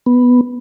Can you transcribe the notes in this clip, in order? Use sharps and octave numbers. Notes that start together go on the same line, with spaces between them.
B3